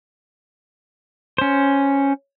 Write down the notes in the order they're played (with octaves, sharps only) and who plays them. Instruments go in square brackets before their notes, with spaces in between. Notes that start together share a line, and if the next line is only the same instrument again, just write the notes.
[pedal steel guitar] C#4 C5